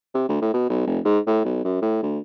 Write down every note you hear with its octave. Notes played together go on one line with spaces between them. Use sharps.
C3
D2
A2
B2
B1
F1
G#2
A2
B1
F#2
A2
D2